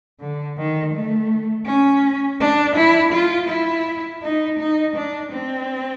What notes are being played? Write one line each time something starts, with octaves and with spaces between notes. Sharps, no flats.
D3
D#3
A3
C#4
D4
E4
F4
E4
D#4
D#4
D4
C4